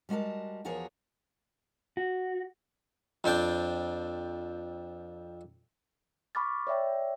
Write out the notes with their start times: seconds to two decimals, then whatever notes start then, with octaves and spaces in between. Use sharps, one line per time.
0.09 G3 G#3 F#4 A#4 A5
0.65 E2 F3 F#4 G#4 A#4 C#5
1.97 F#4
3.24 F2 C4 D4 G5
6.35 B5 C#6 D6 F6 A6
6.67 C#5 D5 E5 G5